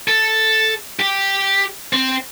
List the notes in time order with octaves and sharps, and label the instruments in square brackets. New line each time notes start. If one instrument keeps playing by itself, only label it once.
[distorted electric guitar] A4
G4
C4